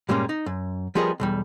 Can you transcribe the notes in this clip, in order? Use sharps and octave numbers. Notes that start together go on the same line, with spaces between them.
G2 A#2 G3 G#3 A#3 C#4
D#4
F#2
F3 G3 B3 G#4 A#4 D#5
B1 E2 G3